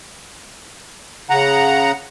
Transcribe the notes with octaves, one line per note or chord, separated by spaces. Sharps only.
C#3 F#5 A#5